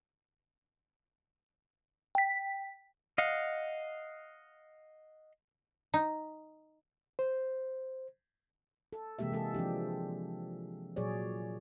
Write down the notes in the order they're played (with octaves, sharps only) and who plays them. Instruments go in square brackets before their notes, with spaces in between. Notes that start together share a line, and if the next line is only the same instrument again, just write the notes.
[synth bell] G5 B6
[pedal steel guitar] D#5 F5 F#5
[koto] D#4
[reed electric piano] C5
[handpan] A4
C3 E3 G#3 A#3 G4 E5
E3 G#3 G#4 A4
F3 C4 D4 G4
A#2 F#3 G#4 C#5 D5